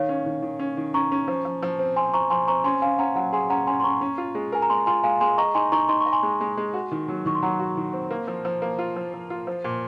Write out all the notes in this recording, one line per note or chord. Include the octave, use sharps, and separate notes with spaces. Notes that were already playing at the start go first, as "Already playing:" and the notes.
Already playing: D#3 C#5 F5
C#4
D#3
D#3
C#4
D#3
C#4 A#5 C#6
C#4
F3
F3
F3
C4
C4 G#5 C6
F3 A#5 C#6
F3 G#5 C6
C4 A#5 C#6
C#4 G#5 C6
C#4 F5 G#5
C#4 F#5 A#5
F#3 F#5 A#5
G#4 G#5 C6
C#4 F#5 A#5
C#4 G#5 C6
C6
C#4 A#5 C#6
C#4
F4
G#3
A#4 G#5
A#5
G#3 G#5 C6
F4 G#5 C6
G#3 F5 G#5
G#3 G#5 C6
D#5 A#5 C#6
D#4 G#5 C6
D#4 A#5 C#6
D#4 C6
C#6
D#5
G#5 C6
G#3
G#3
G#3
F#4
D#3
F#3
D#3 C#6
C6
F#3 F#5 A#5
F#4
D#3
C4
A#3
F3
F3
A#3
F4
F3
F3
F4
F3
A#2